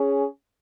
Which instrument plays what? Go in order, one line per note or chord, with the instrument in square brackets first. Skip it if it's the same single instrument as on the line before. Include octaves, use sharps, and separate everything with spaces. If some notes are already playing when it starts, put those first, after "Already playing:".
Already playing: [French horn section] C#4 G#4